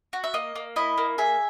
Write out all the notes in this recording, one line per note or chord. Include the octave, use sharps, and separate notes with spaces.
F#4
E5
A#3 D#5
A#3
E4 D#5
A#3
G#4 E5